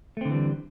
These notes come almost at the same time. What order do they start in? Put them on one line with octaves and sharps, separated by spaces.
A3 C4 D3 E3 G3